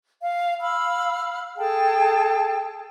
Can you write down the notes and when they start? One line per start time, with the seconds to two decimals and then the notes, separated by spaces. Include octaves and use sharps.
0.21 F5
0.60 F5 B5 E6 F6
1.57 G#4 A4 G5 A5